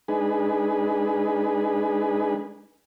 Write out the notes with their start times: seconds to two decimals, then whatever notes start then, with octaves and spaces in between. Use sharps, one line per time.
0.08 G#3 D4 D#4 G#4 B4